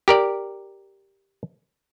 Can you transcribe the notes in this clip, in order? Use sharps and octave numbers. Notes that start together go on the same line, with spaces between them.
G4 A#4 D5